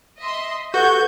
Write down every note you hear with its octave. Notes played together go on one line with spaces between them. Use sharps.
D#5 E5 C6
F#4 G4 A4 B4 G6 G#6